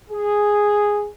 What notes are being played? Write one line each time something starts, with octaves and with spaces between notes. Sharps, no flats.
G#4